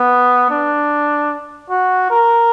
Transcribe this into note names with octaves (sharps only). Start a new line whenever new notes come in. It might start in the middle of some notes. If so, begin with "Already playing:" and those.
Already playing: B3
D4
F#4
A#4